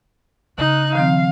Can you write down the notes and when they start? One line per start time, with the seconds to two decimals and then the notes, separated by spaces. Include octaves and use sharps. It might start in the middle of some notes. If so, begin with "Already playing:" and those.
0.58 C#3 D#4 F#6
0.95 D#3 F3 C4 F5